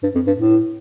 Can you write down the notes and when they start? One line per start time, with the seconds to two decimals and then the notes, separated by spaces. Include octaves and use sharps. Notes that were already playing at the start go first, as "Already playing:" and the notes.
0.03 G2
0.15 F2
0.27 G2
0.39 A2